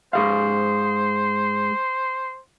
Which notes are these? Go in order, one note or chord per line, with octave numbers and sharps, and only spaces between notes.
G#2 G#4 C5 F5